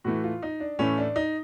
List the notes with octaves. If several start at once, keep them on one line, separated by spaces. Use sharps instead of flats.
A2 E3 A3 F#4
F4
D#4
D4
A2 E3 A3 C#4
D4
D#4